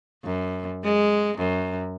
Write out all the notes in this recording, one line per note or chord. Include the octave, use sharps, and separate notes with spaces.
F#2
G#3
F#2